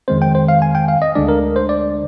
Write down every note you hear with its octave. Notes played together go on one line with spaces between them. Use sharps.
F2 D#3 G#3 C4 C5
G5
C5
F5
G#5
G5
F5
D#5
D2 D3 G#3 D4 D5
A#4
C5
D5